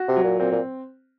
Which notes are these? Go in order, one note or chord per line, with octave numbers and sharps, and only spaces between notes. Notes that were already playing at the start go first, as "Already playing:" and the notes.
Already playing: F#4
C3
F#3
A#2
A#2 C4
A#2